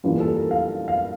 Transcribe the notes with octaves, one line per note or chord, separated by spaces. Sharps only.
G2 E3 G3 A#3 F4
A4
A#4
F5
F5